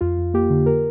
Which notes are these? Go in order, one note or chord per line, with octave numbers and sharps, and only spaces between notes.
F2 F4
F2
A#3 G4
D3
A#4